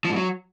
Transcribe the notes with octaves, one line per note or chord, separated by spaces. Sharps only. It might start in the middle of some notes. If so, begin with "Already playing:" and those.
F3
G#2
F#3